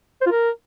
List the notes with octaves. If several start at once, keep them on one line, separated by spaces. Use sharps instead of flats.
C5
F4
A#4